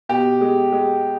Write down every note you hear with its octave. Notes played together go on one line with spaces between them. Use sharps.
B2 G4
G#3
G#3